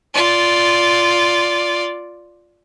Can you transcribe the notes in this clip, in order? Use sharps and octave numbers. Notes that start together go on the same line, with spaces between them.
F4 D5